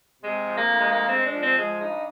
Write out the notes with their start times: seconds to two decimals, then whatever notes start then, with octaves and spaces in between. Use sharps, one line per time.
0.22 C3 G#3
0.45 F3
0.56 A#3
0.67 D2
0.79 G#3
0.90 G#3 A#3
1.06 C4
1.12 G#3
1.23 D4
1.34 F3
1.40 C4
1.56 G#3
1.79 G2 D#4